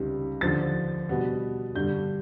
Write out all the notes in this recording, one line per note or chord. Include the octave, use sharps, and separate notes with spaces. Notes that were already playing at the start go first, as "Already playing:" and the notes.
Already playing: C#2 C3 D#3 G3
D#2 D3 F3 A6
B2 G3 B3
G2 D3 G3 G6